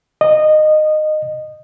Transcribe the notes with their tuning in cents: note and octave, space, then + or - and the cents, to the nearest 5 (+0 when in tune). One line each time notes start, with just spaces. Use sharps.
D#5 -20